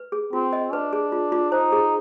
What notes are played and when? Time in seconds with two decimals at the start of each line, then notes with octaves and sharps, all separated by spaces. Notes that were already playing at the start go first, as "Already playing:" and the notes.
Already playing: B4
0.12 G#4
0.33 C4 F4
0.53 D#5
0.73 D4 B4
0.93 G#4
1.12 F4
1.32 F4
1.52 D#4 C5
1.72 G#4